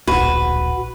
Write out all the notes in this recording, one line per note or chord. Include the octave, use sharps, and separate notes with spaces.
D1 A#1 F#4 B4